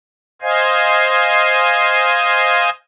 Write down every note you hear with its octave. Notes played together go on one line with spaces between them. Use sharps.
C5 D#5 F5 G#5